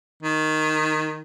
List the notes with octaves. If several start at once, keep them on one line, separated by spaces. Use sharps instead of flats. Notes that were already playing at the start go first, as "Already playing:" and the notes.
D#3